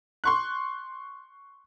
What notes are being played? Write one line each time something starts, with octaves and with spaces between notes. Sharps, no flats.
C6 C#6 F#6